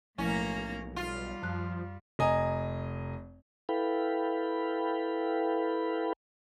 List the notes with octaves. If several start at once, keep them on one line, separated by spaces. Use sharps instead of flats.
B1 A2 F3 A3 A#3 C#4 E4 A#5
G3 F4
F#2 F3 F#6
F1 D#5 G#5 A#5
E4 A4 B4 F5 G5 B5